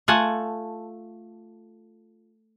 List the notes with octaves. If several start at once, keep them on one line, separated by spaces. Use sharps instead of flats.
A3 F4 F#5 G#5 A5